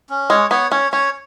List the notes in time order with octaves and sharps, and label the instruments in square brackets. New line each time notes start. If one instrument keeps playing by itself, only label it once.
[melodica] C#4
[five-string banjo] G#3 [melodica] C#5
[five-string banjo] B3 [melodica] C#5
[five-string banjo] C#4 [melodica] C#5
[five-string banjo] C#4 [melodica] C#5